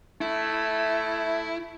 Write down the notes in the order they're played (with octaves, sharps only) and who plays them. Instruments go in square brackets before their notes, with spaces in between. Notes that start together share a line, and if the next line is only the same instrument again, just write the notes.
[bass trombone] A3 [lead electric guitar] E4